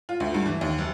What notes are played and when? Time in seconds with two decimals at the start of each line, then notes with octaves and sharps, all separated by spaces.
0.09 F4
0.20 D2
0.34 G2
0.46 E3
0.61 D#2
0.78 F#1